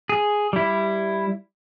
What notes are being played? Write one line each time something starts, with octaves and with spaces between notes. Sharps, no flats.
G#4
G3 E4